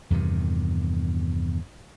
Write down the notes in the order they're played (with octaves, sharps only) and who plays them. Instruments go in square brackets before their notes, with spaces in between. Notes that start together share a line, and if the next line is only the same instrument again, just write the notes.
[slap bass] E2 G2 C3 D#3